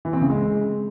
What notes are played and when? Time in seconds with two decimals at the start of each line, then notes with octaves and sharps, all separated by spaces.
0.05 E3
0.13 C4
0.22 C#3
0.30 G#3